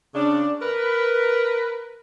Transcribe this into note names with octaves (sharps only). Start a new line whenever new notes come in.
C#3 D4
A#4 B4